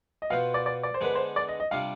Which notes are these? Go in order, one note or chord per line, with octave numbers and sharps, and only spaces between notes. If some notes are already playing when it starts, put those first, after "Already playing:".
D#5
B2 B3 F4 C5 F5
D5
D5
D5
C5
D3 G#3 B3 D4 B4
C5
D5
D#5
D#5
C3 G3 D4 F4 F5